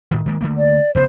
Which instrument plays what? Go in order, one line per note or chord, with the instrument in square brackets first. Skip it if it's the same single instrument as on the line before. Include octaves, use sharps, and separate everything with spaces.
[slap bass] A2 D#3
D#3 G#3 A#3
D3 A3 A#3
[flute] D5
[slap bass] F1 C#3 B3 [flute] C5